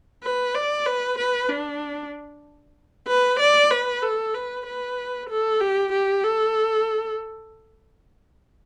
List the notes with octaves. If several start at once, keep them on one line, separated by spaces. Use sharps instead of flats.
B4
D5
B4
B4
D4
B4
D5
B4
A4
B4
B4
A4
G4
G4
A4